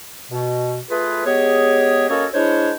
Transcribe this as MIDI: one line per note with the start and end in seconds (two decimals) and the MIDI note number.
0.31 0.78 47
0.90 1.24 57
0.90 1.24 65
0.90 1.24 68
0.90 1.24 71
1.26 2.08 56
1.26 2.08 59
1.26 2.08 67
1.26 2.08 68
1.26 2.08 73
2.09 2.26 58
2.09 2.26 61
2.09 2.26 66
2.09 2.26 69
2.09 2.26 73
2.09 2.26 75
2.34 2.73 56
2.34 2.73 62
2.34 2.73 64
2.34 2.73 72
2.34 2.73 73